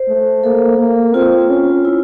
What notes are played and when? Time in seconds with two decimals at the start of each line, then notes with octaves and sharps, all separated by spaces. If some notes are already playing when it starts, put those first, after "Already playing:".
Already playing: C5
0.08 A3
0.44 A#3 A4
0.79 A#3
1.14 C4 F4
1.49 C#4
1.85 E4